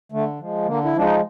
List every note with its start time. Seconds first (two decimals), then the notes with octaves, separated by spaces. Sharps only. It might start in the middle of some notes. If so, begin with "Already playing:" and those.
0.12 D3 A3
0.40 F3 G#3
0.66 D3 A#3
0.84 E4
0.94 F3 G#3 D4
1.03 D#4